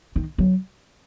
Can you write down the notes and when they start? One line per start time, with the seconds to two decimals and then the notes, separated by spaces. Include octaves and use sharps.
0.16 D#3
0.38 F#3